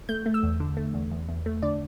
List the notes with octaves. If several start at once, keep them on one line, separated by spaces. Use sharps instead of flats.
A3 G6
A3
E6
E2
D3
A3
E2
E2
E2
A3
D3 D5